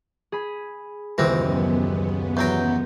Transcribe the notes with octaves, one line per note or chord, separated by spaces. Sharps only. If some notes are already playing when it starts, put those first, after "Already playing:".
G#4 B5
D#1 C#2 F#2 E3 B3 C4 A#6
E2 F#3 G5 A#5 C6 G6